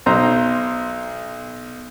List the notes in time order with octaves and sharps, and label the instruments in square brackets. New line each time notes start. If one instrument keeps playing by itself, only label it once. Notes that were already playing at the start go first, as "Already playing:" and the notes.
[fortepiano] B1 C5 A#5